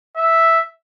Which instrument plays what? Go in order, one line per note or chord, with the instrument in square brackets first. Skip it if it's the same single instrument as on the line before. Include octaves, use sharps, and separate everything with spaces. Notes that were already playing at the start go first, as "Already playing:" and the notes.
[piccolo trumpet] E5